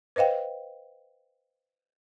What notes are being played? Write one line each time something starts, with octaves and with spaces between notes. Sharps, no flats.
B4 C5 D#5 F5 G5